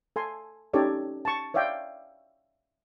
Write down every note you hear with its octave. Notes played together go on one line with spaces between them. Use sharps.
A4 G#5 C6
C#4 D#4 G4 A4 C#5 D5
A5 C#6
C#5 D5 E5 F5 G5